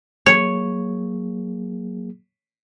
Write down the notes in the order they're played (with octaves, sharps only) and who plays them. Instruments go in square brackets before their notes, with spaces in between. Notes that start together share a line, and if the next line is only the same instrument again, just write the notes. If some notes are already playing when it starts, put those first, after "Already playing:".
[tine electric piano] F#3 A#3 G#4 [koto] C#5